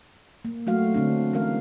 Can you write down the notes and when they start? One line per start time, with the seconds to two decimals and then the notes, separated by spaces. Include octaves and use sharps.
0.45 A#3
0.67 F#3 A3 F#4 F5
0.94 D3 C4 D4
1.33 E3 G#3 C#4 A#4 F5